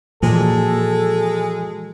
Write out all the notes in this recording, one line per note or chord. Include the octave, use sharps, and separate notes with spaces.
A#2 E3 F3 G#3 F#4 A4